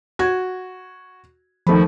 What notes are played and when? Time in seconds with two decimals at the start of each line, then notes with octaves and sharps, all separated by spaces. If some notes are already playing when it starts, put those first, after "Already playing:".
0.19 F#4 G#6
1.67 D#2 F3 A3 B5